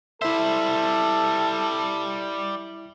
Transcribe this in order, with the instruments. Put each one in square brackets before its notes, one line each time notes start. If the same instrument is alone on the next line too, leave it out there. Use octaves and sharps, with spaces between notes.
[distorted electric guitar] G3 C5 [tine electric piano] E4 E5 [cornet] A4